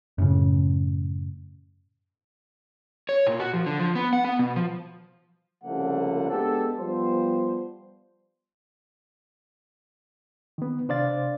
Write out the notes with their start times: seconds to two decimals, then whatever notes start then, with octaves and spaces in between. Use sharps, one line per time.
0.18 F#2 A2 C#3
3.09 C#5
3.27 A#2
3.40 F#4
3.54 F3
3.66 D3
3.79 F3
3.95 B3
4.13 F#5
4.25 B3
4.39 B2
4.56 F3
5.64 C2 C#3 F3 A3 A#3 F#5
6.29 G#3 B3 D4 G4 A4
6.79 F3 G3 B3 C5
10.58 D#3 B3
10.89 C3 D4 C5 D5 F5 A6